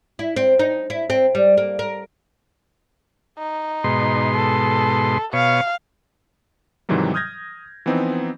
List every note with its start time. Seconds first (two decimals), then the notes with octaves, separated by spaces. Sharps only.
0.19 E4
0.36 C4
0.59 D#4
0.90 E4
1.10 C4
1.35 G3
1.57 A#3
1.79 A#4
3.38 D#4
3.84 G#2 B2 C6
4.36 A4
5.33 B2 C#5 F5
6.89 G#2 C3 D#3 E3 F#3 G3
7.14 D#6 F6 G6 G#6 A#6
7.86 E3 F3 B3 C4 D#4